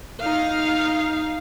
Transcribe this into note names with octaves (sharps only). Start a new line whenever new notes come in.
D#4 F5